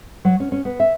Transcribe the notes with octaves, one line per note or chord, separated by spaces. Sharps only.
F#3
C#4
C#4
B3
E5